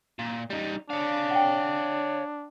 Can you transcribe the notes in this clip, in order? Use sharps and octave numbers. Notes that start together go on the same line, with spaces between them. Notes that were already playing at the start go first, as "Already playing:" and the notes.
A#2
G3 D#4
D4 C#5 F5
F#5 G5